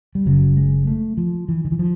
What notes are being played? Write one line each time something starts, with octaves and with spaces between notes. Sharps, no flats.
G3
F#1 F#2 C#3 F#3
G#3
A3
F3
E3
D#3
E3
F3